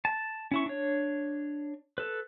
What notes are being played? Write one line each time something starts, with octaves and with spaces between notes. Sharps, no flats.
A5
C#4 E4 C#6
D4 C#5
A4 B4